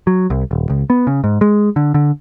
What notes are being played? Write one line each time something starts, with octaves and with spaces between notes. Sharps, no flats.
F#3
C2
D#1
C#2
B3
C#3
G#2
G#3
D3
D3